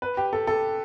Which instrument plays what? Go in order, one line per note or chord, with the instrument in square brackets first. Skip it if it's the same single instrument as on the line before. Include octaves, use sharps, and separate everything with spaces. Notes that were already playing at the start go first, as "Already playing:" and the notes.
[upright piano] B4
G4
A4
A4